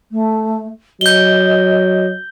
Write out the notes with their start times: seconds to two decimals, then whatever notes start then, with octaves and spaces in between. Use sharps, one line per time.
0.11 A3
1.01 F#3 D#5 G6 G7